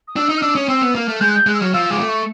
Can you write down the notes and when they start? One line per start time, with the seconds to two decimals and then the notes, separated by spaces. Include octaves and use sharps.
0.07 D#6
0.16 D4 E6
0.29 D#4 D#6
0.37 F6
0.42 D4 E6
0.55 C#4 D#6
0.68 C4 E6
0.82 B3
0.95 A#3 F6
1.08 A3
1.20 G#3 G6
1.29 F#6
1.34 G6
1.47 G#3 F#6
1.54 E6
1.60 F#3 F6
1.74 F3 E6
1.90 G#3 D6
2.00 A3
2.08 C#6